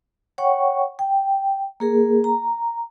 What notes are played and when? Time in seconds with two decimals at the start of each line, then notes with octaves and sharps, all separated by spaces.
0.38 C#5 F#5 G5 C#6
0.99 G5
1.80 A#3 G#4 A#4
2.24 A#5